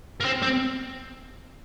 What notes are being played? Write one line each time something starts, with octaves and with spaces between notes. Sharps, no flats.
A#3
C4
C4